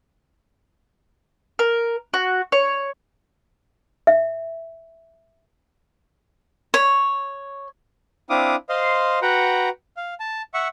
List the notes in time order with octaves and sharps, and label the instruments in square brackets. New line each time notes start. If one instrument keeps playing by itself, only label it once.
[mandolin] A#4
F#4
C#5
[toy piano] E5
[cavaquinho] C#5
[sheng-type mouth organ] C4 D4 E4 F5 D6 D#6
C5 D#5 F5 C6
F#4 B4 F#5 G5 A#5
F5
A5
E5 F#5 C#6